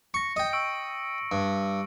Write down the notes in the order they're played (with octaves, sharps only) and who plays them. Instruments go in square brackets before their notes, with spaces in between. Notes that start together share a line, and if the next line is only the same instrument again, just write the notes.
[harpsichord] C#6 [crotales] A#6 C#7
[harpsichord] D#5 G5
[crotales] C#6 E6 D7
[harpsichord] G2